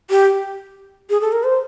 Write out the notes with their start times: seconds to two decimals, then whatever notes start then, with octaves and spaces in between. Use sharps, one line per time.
0.10 G4
1.10 G#4
1.21 A4
1.32 A#4
1.44 C5